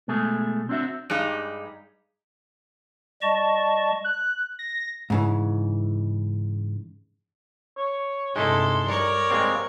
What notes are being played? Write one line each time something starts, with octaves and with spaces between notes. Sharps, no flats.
B2 G#3 A3 G#4
C4 D4 F#4 E5
G2 G3 G#3 D#4
G3 D5 D#5 A5 C#6
F#6
A#6
G#2 C#3 E3
C#5
G2 C3 G#3 D#4 E4 A4 C6
G3 A#4 C#5 D5
G#3 A#3 C4